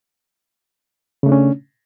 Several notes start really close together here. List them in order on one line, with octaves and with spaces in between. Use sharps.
C#3 A3 D4 C#4